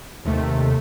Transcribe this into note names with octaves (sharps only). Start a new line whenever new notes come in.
D#2 C3 A3